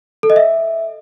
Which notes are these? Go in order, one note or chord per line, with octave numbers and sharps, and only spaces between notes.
A4
D#5
E5